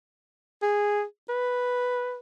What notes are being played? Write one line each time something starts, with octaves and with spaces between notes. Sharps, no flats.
G#4
B4